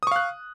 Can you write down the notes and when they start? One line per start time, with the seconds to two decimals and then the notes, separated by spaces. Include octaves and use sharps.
0.03 D#6
0.07 C#6
0.11 F5
0.16 F#6